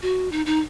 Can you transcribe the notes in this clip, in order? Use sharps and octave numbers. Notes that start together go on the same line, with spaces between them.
F#4
D#4
D#4